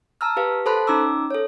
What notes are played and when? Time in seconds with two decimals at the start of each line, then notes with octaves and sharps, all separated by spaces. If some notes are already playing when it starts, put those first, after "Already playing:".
0.21 A5 A#5 E6 F6
0.37 G4 B4 F5
0.66 A4 C5 A5 B5 C6 F#6
0.87 C#4 D#4 A#5 D6 E6
1.31 A4 C#5